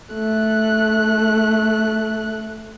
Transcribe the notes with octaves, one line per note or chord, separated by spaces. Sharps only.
A3 F#6